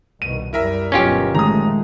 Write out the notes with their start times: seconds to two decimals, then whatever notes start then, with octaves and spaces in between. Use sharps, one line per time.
0.22 C2 B2 D#3 D#7
0.53 F#2 G3 E4 A#4 E5
0.92 G1 B2 F#3 C#4 F4 G4
1.35 A#2 D#3 F3 G#3 A3 A#5 D#6